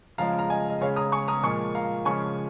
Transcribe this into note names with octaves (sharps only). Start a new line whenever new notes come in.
C#3 F3 G#3 F5 A#5
A#5
D#5 G#5
D#5
C#3 G#3 C#5 F5
A#5 D#6
G#5 C#6
A#5 D#6
A#2 F3 G#3 G#5 C#6
F5 A#5
C#3 F3 G#3 G#5 C#6